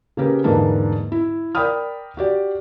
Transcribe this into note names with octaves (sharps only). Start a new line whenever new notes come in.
C#3 A#3 G4 A#4 B4
E2 G#2 D3 A#3 B4 A5
E4
A#4 D5 G5 B5 D#6 F6
F#4 G4 D5